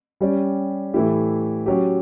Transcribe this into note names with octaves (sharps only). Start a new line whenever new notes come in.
G3 C#4 G4 D5
A2 E3 A3 E4 G4
F#3 C#4 G4